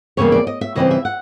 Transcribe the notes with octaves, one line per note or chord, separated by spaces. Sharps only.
E2 C#3 E3 G3 A#3 C#5
D5
D#5
E5
C#3 E3 G3 C4 D#5
E5
F#5